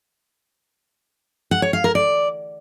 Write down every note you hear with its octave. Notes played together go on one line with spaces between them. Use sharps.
F#5
C#5
F5
A#4
D5